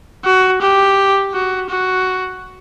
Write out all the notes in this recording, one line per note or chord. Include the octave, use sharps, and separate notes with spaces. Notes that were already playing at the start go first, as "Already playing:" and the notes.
F#4
G4
F#4
F#4